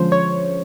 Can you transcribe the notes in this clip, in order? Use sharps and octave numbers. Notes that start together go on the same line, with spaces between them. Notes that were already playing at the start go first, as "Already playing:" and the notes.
Already playing: D3 F3 G#3 C#4 C5
C#5